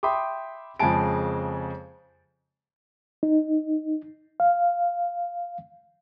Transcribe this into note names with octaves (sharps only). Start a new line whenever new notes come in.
E5 G5 B5 C6 D6 D#6
F2 C#3 G#3 G#5 A5 D7
D#4
F5